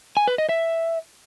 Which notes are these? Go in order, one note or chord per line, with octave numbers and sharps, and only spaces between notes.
G#5
B4
D#5
E5